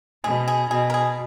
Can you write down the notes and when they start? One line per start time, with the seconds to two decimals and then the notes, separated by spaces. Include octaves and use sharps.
0.24 B2 G#4
0.48 G#4
0.70 B2 G#4
0.90 A#4
0.94 G#4